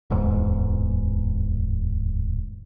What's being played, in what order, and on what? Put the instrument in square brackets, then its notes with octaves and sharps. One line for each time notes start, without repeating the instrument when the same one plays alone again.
[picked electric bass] D1 E2 G#2